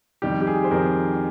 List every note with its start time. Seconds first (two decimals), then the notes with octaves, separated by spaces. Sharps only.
0.22 F2 D#3 G3 G4
0.41 G4
0.47 G#4
0.64 C5
0.71 F2 D#3 G3 A#4